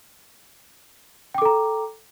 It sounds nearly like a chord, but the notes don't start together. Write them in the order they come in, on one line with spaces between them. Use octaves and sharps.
G5 D6 A4 A#5